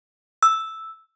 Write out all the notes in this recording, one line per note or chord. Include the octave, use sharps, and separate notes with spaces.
E6